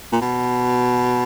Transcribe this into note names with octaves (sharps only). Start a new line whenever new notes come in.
A#2
B2